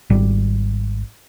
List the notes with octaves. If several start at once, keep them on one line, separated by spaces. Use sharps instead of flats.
G#1 G3